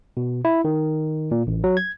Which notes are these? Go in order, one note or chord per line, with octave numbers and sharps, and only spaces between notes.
B2
E4
D#3
A#2
A1
F#3
G#6